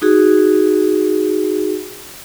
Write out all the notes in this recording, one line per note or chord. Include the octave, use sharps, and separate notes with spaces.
D#4 F#4 G#4